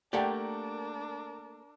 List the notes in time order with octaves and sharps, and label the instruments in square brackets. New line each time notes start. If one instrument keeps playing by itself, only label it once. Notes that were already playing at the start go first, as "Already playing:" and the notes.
[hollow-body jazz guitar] A3 A#3 G4 [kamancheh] D4 A#4 [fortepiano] D5 F#5 G5